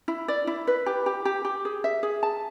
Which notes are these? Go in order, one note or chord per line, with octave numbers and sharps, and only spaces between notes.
E4
D5
E4
B4
G4
G4
G4
G4
G#4
E5
G#4
A5